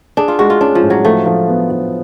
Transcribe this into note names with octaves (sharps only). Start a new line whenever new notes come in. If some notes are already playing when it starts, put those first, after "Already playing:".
D4 G#4
F4
G#3 F#4
F4
C#4 D4
F3
A2
F#3
F3 A3
F3
B3
F3